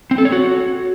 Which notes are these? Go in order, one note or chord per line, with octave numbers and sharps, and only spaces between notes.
C4
A4
C#5
F#4